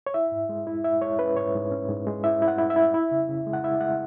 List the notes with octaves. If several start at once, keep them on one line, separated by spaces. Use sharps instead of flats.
C#5
E4 E5
G#2
G#3
E4
E4 E5
G#3 C#5
C#4 B4
G#2 C#5
G#2
C#4
G#2
G#3
E4 E5
E4
F#5
E4
E5
E4
E4
C#3
C#3
G#3
F#5
E4 E5
G#3 F#5